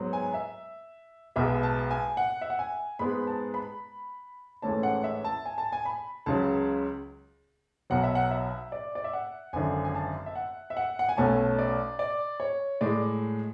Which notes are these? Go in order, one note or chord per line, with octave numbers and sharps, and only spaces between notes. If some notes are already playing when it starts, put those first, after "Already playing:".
Already playing: G#2 F#3 B3
G#5
E5
B1 B2 G#3 B3 E5
A5
G#5
F#5
E5
F#5
G#5
G#2 G#3 B3 B5
A5
B5
A1 G#2 E3 A3 C#4 A5
F#5
E5
A5
G#5
A5
G#5
B5
C#2 C#3 F#3 A5
B1 B2 F#3 F#5
E5
F#5
E5
D5
D5
E5
F#5
G#1 F#2 D3 G#5
G#5
A5
E5
F#5
E5
F#5
F#5
G#5
B1 B2 A3 C#4 A5
D5
D5
C#5
A2 G#3 D5